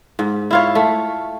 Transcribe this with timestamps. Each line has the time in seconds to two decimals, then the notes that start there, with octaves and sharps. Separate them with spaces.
0.19 G#2
0.51 E4 F4 C#5
0.75 A3